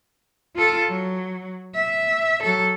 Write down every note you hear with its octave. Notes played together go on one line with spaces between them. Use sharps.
F4 A4
F#3
E5
F#3 A4